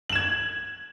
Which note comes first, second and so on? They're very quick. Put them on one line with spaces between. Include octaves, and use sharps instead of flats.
F#7 E7 G#6